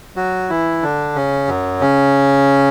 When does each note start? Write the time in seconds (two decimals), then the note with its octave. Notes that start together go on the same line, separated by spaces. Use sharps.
0.16 F#3 F#4
0.50 E3 E4
0.83 D3 D4
1.15 C#3 C#4
1.48 F#2 F#3
1.81 C#3 C#4